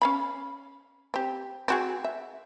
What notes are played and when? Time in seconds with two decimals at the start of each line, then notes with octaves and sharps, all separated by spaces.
0.02 C#4 F5 B5
1.14 C4 G4
1.68 C4 F#4 G#4
2.04 E5